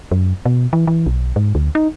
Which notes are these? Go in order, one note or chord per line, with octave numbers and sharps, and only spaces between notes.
F#2
B2
E3
E3
B1
G#2
D2
D#4